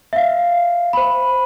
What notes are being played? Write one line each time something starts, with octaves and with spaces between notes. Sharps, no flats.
E5 F5
C5 B5